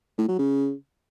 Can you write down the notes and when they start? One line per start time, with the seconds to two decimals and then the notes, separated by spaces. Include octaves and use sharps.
0.18 A2
0.28 F#3
0.39 C#3